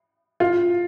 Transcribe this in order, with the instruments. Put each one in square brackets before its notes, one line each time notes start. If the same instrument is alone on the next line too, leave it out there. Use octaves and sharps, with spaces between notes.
[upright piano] F4